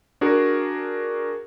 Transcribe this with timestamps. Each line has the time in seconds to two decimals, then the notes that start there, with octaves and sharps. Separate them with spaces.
0.21 D4 F#4 G#4 A#4